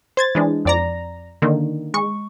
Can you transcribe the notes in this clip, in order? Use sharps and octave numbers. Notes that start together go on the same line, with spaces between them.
C5 G#6 A6
E3 G#3 D4
F2 D5 A#5
D3 D#3 A#3
G#3 C#6